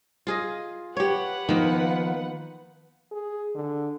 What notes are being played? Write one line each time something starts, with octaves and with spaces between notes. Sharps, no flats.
F4 G#4 D#5
G4 B4 C#5 F#5
D#3 F3 A#3 B3
G#4
D3